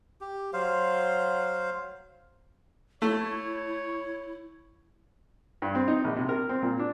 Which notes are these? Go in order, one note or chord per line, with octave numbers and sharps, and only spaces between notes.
G4
F#3 C5 F5
A3 E4 C#5
G2
C4
D#4
A#1
C3
A#4
C4
A#2
D4